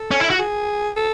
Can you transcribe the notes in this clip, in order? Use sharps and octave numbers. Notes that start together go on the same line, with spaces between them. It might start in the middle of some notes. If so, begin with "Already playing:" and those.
Already playing: A4
C#4
E4
F#4
G#4
A4